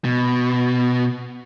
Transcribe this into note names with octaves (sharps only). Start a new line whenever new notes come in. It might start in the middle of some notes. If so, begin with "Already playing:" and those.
B2